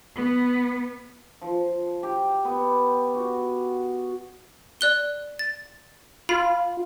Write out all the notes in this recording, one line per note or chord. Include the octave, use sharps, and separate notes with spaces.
B3
F3
G4
B3
F#4
D5 F#6 G7
A6
F4 B5